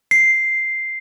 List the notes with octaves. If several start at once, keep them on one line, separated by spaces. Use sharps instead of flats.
C7